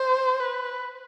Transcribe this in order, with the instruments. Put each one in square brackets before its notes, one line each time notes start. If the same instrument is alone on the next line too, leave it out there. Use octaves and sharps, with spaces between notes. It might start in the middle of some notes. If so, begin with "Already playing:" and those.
Already playing: [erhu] C5
B4